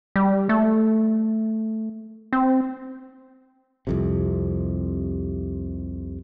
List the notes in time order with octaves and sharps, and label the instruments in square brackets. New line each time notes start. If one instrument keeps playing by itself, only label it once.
[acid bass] G3
A3
C4
[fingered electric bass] C2 F2 C3